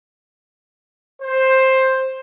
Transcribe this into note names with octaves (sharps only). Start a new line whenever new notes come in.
C5